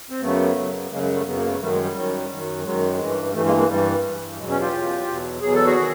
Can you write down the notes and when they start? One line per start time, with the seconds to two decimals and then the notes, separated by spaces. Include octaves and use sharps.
0.10 C4
0.21 F#2 C#3 F#3 A3 B3
0.57 F#2 C#3 F#3
0.91 F#2 C#3 F#3 G#3 A#3
1.03 G#3
1.14 G3 A3
1.25 F#2 C#3 F#3 B3
1.37 A#3
1.48 A3 B3
1.60 F#2 D#3 F#3 G3 A3
1.72 G#3
1.84 G3
1.95 F#2 D#3 F#3
2.30 F#2 D#3 F#3
2.64 F#2 D#3 F#3 G#3
2.99 G2 E3
3.34 E3 G3 A3
3.37 G2
3.45 G#3 A#3
3.57 G#3 A#3
3.68 G2 E3 G3
4.03 G2 E3
4.38 E2 B2 F#3 G#3
4.50 B3 C#4
4.61 F4 G4
4.72 E2 B2 F#3
5.07 E2 B2 F#3
5.41 E2 B2 F#3 G#4
5.54 A4
5.66 F#4 G#4
5.77 D#3 F#3